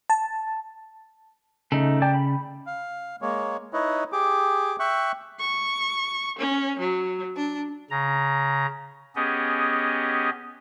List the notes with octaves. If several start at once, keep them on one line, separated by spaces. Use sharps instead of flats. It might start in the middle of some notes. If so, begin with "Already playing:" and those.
A5
C#3 A3 D#4 A4
D5 G5 A5
B5
F5
G#3 A#3 C#5
D#4 E4 B4 C#5 D#5
G4 G#4 D6
E5 G5 C#6 F#6
C#6
C#4
F#3
D4
C#3 A#5
B3 C#4 G4 G#4 D#5